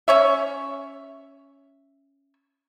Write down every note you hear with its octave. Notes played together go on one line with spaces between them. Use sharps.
C#4 C#5 E5